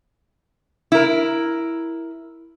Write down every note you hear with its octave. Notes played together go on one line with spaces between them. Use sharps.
E4 A#4